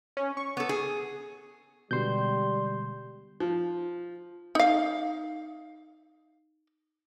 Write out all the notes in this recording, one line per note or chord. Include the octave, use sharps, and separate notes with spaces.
C#4
C#6
B3 A4
G#4
B2 D3 G3 G#3 C6 G6
F3
D#4 F5